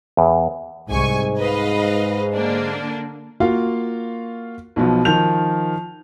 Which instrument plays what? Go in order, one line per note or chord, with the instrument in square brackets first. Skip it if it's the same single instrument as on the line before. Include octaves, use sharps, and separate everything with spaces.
[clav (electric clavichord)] E2
[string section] C2 G#5 C#6 [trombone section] G#2
[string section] B4 D#5 F5
D3 A#3 D4
[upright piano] A#3 F4 F#4 F5
B1 B2 F3
D#3 F3 G6 F7